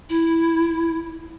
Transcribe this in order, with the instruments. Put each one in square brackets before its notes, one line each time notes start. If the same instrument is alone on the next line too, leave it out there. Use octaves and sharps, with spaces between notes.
[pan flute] E4